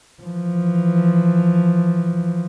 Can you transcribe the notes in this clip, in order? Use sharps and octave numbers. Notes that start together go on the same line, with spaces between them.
E3 F3